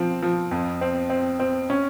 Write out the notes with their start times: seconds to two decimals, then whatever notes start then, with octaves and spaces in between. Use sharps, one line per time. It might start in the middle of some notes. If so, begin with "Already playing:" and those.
Already playing: F3 C4
0.22 F3
0.51 F2
0.81 C4
1.10 C4
1.40 C4
1.70 C#4